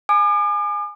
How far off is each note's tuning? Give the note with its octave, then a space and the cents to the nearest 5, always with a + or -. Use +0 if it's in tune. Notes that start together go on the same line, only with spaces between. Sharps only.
G#5 +0 D6 +45